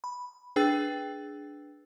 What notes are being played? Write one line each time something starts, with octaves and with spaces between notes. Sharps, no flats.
B5
D4 G#4 B4 G5 E6 A6